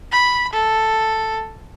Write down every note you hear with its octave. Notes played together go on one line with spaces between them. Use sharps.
B5
A4